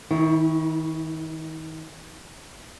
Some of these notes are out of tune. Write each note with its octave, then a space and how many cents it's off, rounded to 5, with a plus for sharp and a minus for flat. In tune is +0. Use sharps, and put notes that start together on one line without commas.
D#3 +35 E4 -15